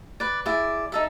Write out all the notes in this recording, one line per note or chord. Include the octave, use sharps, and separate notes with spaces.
B4 D5
E4 G#4 D5
D#4 A4 E5